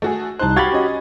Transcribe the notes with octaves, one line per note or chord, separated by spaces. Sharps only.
A3 F#4 G#4
C2 D#4 C5 A5 F#6
F#4 G4 F5 B5 G#6 A6
C#4 D#5